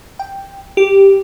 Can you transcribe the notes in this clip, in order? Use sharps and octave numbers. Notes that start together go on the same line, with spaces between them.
G5
G4